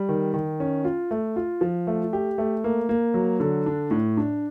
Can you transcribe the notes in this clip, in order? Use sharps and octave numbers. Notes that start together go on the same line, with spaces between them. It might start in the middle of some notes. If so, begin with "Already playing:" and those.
Already playing: G3
D#3
D#3
C#4
F4
A3
F4
F3
A3
G4
A3
A#3
A#3
F#3
D3
D4
A2
D4